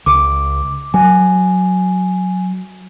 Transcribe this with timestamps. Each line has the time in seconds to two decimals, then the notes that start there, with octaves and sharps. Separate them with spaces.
0.06 C#2 D6
0.94 F#3 G#5